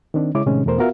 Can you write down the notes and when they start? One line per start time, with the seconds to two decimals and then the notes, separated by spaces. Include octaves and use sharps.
0.14 D#3 C4 D4
0.35 C#3 G#3 E4 C#5 D6
0.46 A2 C3 D#3 G#3 C#4
0.66 E2 B2 A3 A#4 C5
0.78 B3 F4 F#4 A#4 E5 F5